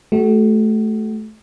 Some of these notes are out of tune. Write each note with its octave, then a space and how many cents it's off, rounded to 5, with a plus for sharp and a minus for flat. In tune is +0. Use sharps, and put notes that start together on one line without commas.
A3 -20 F#4 +30